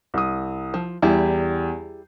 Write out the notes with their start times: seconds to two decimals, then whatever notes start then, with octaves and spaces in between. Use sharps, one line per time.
0.14 C2 D#6
0.74 F3
1.02 E2 G3 E4 G4 G#4